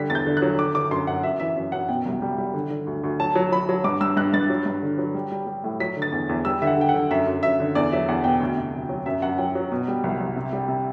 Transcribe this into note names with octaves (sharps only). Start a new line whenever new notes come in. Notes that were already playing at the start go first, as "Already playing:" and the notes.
Already playing: D3 G3 B6
E2 A6
G6
D3
F#6
F#3
D3 D6
D3 D6
F#2 C6
F#2 F#5
F#2 E5
E3 E5
F#2 E5
F#2 F#5
B2 G5
C2
G3
G3
D3
D3
D2
D2
F#3 A5
F#3
F#3 B5
F#3
G2 D6
G2 E6
G2 F#6
G2 A6
F#3
G2
D3
F#3
G3
G3
G3
A2
F#3 B6
D3
A6
E2
E2
G3 E6
D3 E5
F#5
D3 G5
F#5
D3
F#2 E5
F#2
F#2 E5
D3
E2 D5
F#3 E5
E2 F#5
B2 G5
D2
C3
D2
F#3
F#2 E5
F#2 F#5
F#3 G5
F#3
B2
G3
C2
C2
C3
G3
C3